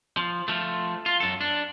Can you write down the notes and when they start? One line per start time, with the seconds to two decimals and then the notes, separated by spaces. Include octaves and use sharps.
0.17 F3
0.48 F3 A3
1.06 F4
1.20 F#2 A4
1.41 D4